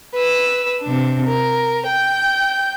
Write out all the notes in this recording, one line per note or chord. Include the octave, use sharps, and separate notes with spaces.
B4 E6
C3 D4
A#4
G5 G6